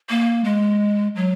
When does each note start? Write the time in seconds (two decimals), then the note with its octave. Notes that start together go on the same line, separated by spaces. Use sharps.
0.10 A#3
0.45 G#3
1.16 F#3